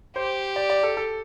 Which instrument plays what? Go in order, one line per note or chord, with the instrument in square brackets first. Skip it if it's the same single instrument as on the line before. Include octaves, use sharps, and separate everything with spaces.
[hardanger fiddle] G4 [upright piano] C5
[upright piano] D5
D5
A4
A4